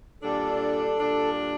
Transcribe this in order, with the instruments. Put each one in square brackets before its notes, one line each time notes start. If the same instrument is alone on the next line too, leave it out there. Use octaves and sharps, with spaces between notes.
[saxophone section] A#2 G3 D4 [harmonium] A4
[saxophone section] A#2 G3 D4